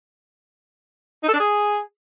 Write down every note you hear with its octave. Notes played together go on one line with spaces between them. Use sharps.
D#4
A4
D4
G#4